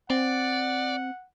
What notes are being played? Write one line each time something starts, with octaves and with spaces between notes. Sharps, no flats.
C4 D5 F#5